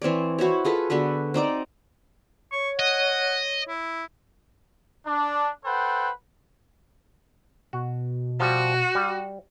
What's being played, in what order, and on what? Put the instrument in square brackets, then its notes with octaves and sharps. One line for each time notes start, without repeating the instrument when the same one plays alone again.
[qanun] E3 C4 C#5 D5
E4 F#4 C5 C#5
F4 G#4 A4 B4
D3 B3 F#4 B4
C4 D#4 D5 A#5
[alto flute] C#5 [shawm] C#6
[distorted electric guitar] D#5 [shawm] F#5
[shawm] E4
[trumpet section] D4
A4 B4 C5 F#5 G5
[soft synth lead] B2 [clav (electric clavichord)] F#4
[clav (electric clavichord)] F3 G3 [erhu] F#4
[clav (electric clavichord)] G3